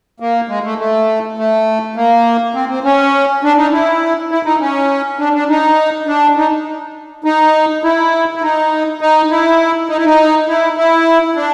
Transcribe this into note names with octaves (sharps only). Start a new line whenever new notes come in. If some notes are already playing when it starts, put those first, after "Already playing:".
A#3
G#3
A3
A3
A3
A#3
C4
C4
C#4
D4
D#4
E4
E4
D#4
C#4
D4
D4
D#4
D4
D#4
D#4
E4
E4
D#4
D#4
E4
D#4
E4
D#4
E4
E4
D4